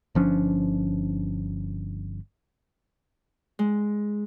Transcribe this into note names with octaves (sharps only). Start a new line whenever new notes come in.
G1 F3 C#4 D4
G#3